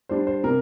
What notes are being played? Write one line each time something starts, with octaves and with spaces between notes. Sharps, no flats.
G3 D4 C5
C5
C3 A#4